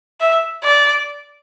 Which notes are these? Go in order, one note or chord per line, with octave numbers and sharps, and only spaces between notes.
E5
D5